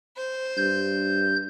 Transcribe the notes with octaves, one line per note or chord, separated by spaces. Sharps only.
C5
G2 G6